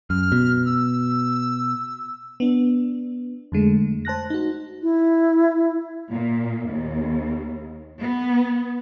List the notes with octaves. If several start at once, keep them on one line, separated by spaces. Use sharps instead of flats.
F#2 F6
B2
E6
B3 D4
F2 D3 G#3 A3
C5 A5 F#6 A#6
D#4 F#4
E4
A#2
D#2
B3